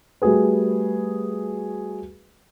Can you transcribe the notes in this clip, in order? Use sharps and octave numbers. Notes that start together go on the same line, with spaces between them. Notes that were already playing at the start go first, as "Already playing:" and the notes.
G3 A3 F#4 G#4 B4